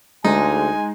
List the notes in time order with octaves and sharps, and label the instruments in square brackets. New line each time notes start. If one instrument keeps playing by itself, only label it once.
[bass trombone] D2 [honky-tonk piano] G#3 [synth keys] D#4 [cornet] G#5